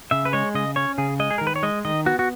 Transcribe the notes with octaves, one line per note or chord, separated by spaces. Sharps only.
C#3 E5
B4
G#3 C#5
C#3 D#5
C#4 C#5
C#3 G#4
G#3 D#5
G#4
D#3 A#4
B4
C#5
G#3 D#5
D#3 D#5
B3 F#4
F#4